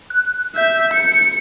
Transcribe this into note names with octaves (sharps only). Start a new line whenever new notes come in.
F#6
E5 G6
C#7